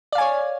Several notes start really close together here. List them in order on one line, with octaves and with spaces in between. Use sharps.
D5 F5 G#5 C#5